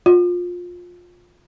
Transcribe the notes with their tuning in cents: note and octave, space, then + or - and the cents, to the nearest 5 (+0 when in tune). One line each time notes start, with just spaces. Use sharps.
F4 +20